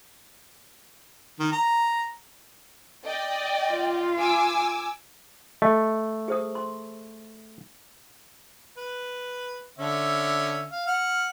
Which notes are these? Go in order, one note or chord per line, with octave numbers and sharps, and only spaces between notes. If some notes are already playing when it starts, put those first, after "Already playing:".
D#3
A#5
D5 D#5 G5
F4
G#5 D6 E6
A3 D#5
G#4 C5 D#6
C6
B4
D3 C#4 E5
F5
F#5 F6